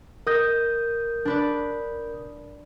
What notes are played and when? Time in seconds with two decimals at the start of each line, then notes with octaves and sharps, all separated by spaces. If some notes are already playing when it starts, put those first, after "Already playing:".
0.27 A#4 D#5 D#6 G6
1.25 D4 B4 D5